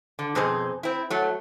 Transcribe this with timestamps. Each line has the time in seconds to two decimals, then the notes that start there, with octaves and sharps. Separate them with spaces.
0.19 D3
0.35 F2 B2 C4 D#4 G#4 C5
0.83 C4 E4
1.10 F#3 A3